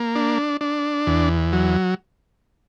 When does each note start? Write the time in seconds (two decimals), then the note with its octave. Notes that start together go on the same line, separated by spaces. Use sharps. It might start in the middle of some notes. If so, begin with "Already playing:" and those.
Already playing: A#3
0.15 D4
0.61 D4
1.07 E2
1.53 F#3